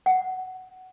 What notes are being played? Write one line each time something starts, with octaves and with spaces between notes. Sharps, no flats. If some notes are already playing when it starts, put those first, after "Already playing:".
F#5